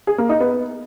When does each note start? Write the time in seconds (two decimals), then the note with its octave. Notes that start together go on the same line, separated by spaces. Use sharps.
0.07 G#4
0.18 A#3
0.29 D#4
0.40 B3